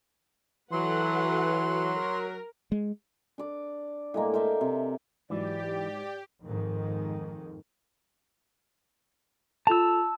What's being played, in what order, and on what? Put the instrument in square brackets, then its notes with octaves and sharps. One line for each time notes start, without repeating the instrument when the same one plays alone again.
[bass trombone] E3 [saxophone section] F#3 [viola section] A4 B4 F#5 [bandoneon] C6
[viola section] A#4
[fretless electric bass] G#3
[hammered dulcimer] D4 D5
A2 G#3 A#3
A#4 C5 E5 A5
C3
[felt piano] G#2 F#3 [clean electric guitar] E3 [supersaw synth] G4 [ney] D5
[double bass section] F2 G#2 D#3
[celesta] F4 A4 F7 [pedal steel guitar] A5 E6